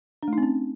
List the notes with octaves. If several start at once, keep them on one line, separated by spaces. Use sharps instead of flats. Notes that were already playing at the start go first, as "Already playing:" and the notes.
D4
A3
D#4
C4
C#4